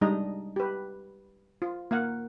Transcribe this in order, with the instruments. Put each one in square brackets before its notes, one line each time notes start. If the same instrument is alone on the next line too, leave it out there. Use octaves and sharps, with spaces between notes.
[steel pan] G3 G#3 D4 D#4 D#5 A#5
G4 B4
F4
A#3 F5 F#5